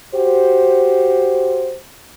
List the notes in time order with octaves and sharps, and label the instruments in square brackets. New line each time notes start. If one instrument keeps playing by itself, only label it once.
[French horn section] F#4 G4 C5